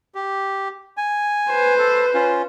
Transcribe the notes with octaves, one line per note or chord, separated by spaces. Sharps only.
G4
G#5
B4 C5
A4
C#4 F4